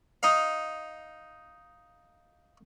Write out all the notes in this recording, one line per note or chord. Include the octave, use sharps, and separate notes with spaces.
D#4 F5